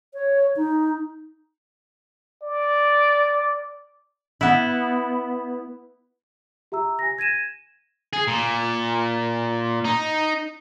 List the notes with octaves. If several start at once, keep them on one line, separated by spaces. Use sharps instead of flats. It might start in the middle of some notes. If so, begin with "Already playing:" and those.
C#5
D#4
D5
B3 E4
G4 E5 A#5 E6
G#5 A#6
G#6 A#6 D#7 E7
G#4
A#2
D#4